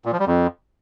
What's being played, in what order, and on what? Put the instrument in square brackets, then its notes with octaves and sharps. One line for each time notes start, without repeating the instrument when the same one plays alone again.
[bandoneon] A#2
F3
G3
F2